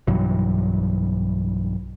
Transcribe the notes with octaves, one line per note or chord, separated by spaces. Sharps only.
B1 G2 E3 F#3